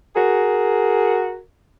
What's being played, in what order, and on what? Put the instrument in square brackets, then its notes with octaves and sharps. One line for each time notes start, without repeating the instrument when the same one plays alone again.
[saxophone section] F#4 G#4 A#4